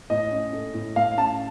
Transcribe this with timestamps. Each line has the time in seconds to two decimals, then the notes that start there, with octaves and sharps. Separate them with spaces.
0.10 A2 D#5
0.31 C#4
0.53 A3
0.74 A2
0.96 A2 F5
1.17 C#4 A5